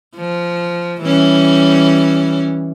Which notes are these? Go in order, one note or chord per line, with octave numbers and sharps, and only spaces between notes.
F3
E3 G3 C#4